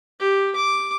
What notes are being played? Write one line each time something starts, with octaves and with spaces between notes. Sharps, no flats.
G4
D6